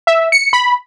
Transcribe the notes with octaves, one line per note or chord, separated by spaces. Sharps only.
E5
C#7
B5